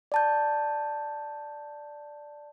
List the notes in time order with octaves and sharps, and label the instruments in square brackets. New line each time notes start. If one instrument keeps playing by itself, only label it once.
[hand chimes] D5 A5 G6